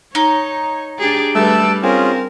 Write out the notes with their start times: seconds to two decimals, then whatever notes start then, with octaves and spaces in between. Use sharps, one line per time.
0.15 D#4 C#5
0.99 D4 G4 G#4
1.35 G3 A3 G4 B4 A5 E6
1.83 C4 C#4 F4 G#4 A#4